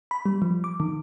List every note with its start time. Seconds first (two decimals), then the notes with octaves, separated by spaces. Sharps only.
0.11 B5
0.26 G3
0.42 F3
0.64 D6
0.80 D#3